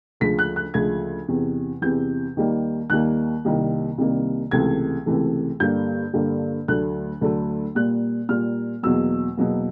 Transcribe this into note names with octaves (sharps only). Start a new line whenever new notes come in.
D2 C#3 F3 G#3 B6
F#6
F#6
D2 C#3 F3 G#3 G#6
E2 C3 E3
E2 C3 E3 G6
D#2 D#3 G3 A#3
D#2 D#3 G3 A#3 F#6
C2 C3 D#3 G3 A#3
C2 C3 D#3 G3 A#3
C#2 C3 E3 A3 G#6
C#2 C3 E3 A3
G2 D3 G3 A#3 G6
G2 D3 G3 A#3
D2 D3 F#3 A3 F#6
D2 D3 F#3 A3
A#2 G3 A#3 F#6
A#2 G3 A#3 F6
E2 B2 F#3 A#3 E6
E2 B2 F#3 A#3